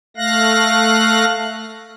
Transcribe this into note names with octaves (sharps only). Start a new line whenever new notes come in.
A3 F5 F#6 A#6